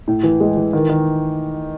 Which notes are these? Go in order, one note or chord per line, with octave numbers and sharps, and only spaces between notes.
A2
E3
G#3
E3
D#3
D#3